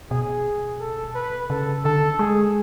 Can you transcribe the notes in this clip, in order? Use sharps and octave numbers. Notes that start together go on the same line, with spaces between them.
B2 G#4
A4
B4
C#3 A4
D3 A4
G#3 G#4